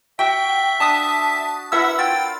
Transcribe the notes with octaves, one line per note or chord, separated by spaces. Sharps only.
F#4 E5 G5
D4 A5 D#6 B6
E4 A#4 B4 E5 F#5 E6
F4 G5 E6 A6